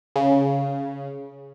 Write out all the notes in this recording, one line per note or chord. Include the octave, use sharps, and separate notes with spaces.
C#3